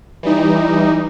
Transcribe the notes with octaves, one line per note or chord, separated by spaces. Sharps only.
E3 G3 D#4